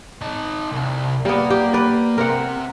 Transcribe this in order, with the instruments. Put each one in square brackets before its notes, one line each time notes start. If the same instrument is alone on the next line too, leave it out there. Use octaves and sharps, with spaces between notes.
[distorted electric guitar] D#4 A5
C2
[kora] G3 B3 [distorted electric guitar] A#3
[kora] G4
B4 D5
[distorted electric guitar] C3 [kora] A#4 F#5